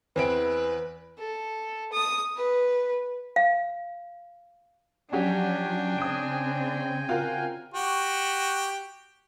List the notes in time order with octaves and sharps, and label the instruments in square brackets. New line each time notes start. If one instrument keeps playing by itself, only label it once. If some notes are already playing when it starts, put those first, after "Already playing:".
[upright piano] E2 [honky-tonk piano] C4 E4 D7 [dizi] B4
[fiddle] A4
D#6
B4
[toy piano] F5
[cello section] F3 F#3 [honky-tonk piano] C#4 F#4 G4 [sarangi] D4 [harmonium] G5 G#5
[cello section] C#3 C4 [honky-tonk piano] D#6 D7
[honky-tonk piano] F4 F#4 A#4
[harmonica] F#4 G4